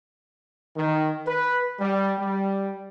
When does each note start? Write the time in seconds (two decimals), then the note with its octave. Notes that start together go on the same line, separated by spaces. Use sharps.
0.77 D#3
1.27 B4
1.80 G3
2.19 G3